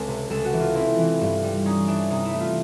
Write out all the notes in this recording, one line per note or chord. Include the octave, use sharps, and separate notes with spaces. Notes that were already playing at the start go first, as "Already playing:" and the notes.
Already playing: C#2 C4 A4
C3
C#2 A4
F#4
E3
F4
C4 E4
E3
G2
G3
C#4 D#4
E3 D4
C3 D#4
E4
A3
F4